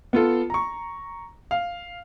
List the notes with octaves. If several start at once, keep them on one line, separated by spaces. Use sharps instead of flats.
B3 F4 A4
A#5 C#6
F5